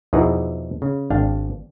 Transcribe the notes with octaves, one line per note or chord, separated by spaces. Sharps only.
E2 B2 E3 F3 D#4 G#4
C#3
G#1 D4 F5 G5